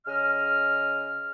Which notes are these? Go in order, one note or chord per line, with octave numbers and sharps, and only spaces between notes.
C#3 D#5 F6